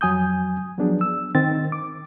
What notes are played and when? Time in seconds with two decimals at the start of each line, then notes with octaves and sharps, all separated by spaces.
0.01 F2 F#3 G#5 D#6 G6
0.78 F3 F#3 B3 D4 G#4
1.01 E6
1.35 D#3 C4 A6
1.72 D6